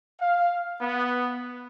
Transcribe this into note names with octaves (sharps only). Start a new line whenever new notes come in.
F5
B3